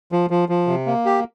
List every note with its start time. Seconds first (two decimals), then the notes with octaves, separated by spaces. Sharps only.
0.12 F3
0.30 F3
0.49 F3
0.67 C3
0.87 A#3
1.05 G4